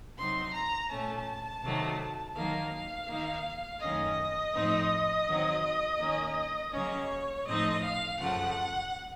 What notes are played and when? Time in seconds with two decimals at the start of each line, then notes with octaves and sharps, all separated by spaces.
0.16 C3 F#3 C4 D#4 C6
0.53 A#5
0.88 A#2 A3 C#4 A5
1.62 C3 D#3 F#3 A3
2.35 D#3 F#3 A#3 F5
3.07 D#3 A#3 D#4
3.80 F#2 D#3 A3 C#4 D#5
4.53 A2 F3 A3 C4 D#4
5.26 D#3 F#3 C4
5.99 D#3 A#3 C#4
6.72 C#3 F#3 A#3 C#4 C#5
7.46 A2 F3 A3 C4 D#4 D#5
7.82 F5
8.18 F#2 C#3 F3 A3 F#5